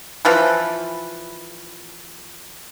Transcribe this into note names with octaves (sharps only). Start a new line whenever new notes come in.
E3 F3 B4